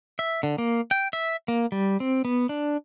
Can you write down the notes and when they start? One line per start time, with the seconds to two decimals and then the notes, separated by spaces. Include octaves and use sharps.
0.19 E5
0.43 D3
0.58 A#3
0.91 G5
1.13 E5
1.48 A#3
1.72 G3
2.00 C4
2.25 B3
2.49 D4